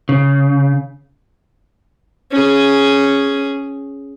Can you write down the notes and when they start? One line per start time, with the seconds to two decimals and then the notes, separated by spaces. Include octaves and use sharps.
0.09 C#3
2.31 C#4 G#4